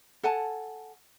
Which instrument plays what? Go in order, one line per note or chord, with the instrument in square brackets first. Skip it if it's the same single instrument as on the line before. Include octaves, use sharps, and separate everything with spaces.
[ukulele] A4 F#5 G#5 A5